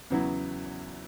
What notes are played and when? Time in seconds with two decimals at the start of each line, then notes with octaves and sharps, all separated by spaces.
0.10 E2 C#3 F#3 B3 E4